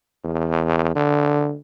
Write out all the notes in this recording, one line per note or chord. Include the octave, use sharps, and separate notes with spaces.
E2
D3